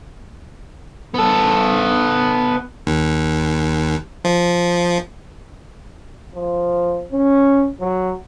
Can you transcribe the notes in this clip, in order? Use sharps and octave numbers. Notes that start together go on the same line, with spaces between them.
B3 A4
D#2
F3
F3
C#4
F#3